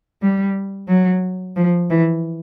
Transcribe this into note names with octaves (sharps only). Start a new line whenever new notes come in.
G3
F#3
F3
E3